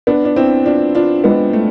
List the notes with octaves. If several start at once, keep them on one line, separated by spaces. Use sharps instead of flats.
B3 D4
D4
C4 E4
D4 F4
D4 F4
G#3 B3
A3